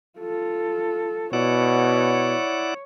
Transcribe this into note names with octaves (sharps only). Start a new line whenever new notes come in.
F4 A4
B2 E4 C#5 D5 F#5